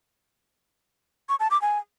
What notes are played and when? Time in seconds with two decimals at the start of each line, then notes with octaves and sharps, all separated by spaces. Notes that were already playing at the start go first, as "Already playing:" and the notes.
1.29 C#6
1.40 A5
1.51 D6
1.62 G#5